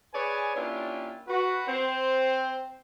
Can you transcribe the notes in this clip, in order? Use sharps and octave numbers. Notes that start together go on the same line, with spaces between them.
G#4 B4 C#5 D5 G#5
A#3 C#4 D4 E4 F4 G4
F#4 B4
C4 C5